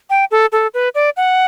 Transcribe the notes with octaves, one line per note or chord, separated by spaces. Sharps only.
G5
A4
A4
B4
D5
F#5